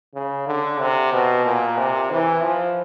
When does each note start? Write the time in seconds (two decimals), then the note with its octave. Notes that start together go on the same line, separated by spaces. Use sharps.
0.14 C#3
0.47 D3
0.80 C3
1.13 B2
1.46 A#2
1.78 C3
2.11 E3
2.43 F3